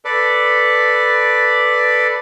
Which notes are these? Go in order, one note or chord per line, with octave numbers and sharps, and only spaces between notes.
A4 B4 D5